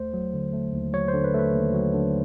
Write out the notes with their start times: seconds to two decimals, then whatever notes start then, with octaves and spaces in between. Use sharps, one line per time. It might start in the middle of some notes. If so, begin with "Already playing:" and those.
Already playing: D#2 A3 C5
0.14 F#3
0.34 D3
0.53 A3
0.74 D#2
0.93 F#3 C#5
1.08 C5
1.13 D3
1.24 B4
1.34 A3
1.39 B4
1.54 D#2
1.74 F#3
1.94 D3